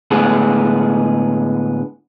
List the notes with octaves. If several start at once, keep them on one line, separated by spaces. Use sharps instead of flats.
A2 D3 G#3 B3 G#4